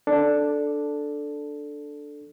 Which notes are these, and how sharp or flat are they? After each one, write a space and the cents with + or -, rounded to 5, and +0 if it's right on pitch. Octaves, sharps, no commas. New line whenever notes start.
D4 +0 A4 +0